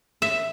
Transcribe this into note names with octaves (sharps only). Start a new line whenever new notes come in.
E5